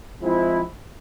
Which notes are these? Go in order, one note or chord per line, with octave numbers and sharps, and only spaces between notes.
F3 G#3 C4 E4